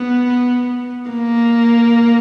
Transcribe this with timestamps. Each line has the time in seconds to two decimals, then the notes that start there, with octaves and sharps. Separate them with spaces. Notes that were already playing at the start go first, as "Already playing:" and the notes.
Already playing: B3
1.10 A#3